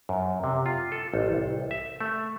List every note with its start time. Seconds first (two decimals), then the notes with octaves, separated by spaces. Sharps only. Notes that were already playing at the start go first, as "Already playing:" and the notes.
0.09 F#2
0.44 C3
0.66 F4
0.92 A4
1.14 A1
1.29 C2
1.71 E5
2.00 A3